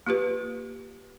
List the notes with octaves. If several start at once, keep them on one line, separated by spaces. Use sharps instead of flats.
A#3 F4 G4 B4